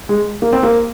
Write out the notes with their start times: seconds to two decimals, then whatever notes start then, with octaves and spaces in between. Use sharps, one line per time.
0.09 G#3
0.42 A#3
0.53 C4
0.63 A#3